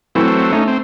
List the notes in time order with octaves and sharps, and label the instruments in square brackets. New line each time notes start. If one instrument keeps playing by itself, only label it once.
[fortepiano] E3 B4 [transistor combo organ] F#3 A3 C4
[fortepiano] A3 [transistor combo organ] C#4 D#4
[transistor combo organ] C4